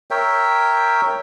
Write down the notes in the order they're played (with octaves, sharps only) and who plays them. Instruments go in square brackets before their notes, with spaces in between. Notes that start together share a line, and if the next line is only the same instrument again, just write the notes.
[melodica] A#4 C#5 E5 G5